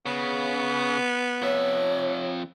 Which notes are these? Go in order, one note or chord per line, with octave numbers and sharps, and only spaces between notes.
C#3 B3
F2 C#5 E5